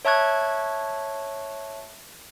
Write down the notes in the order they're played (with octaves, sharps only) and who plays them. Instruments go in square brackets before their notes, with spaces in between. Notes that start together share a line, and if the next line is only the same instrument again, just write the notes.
[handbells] C#5 E5 A5 C#6 F#6 G#6